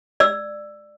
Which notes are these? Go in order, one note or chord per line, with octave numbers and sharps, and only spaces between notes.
D5 E6